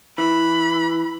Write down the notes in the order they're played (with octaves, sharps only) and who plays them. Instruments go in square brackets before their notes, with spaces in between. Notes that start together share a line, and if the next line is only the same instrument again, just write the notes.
[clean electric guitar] E3 [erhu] B5